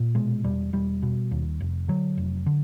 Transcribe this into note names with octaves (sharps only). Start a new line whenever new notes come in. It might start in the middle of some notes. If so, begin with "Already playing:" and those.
Already playing: A#2
B2 G#3
E1 G3
E1 G3
B2
D#2
F1
D3 F#3
F1
D3